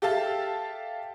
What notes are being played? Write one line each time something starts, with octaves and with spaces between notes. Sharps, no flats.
G4 A4 E5 F5 A5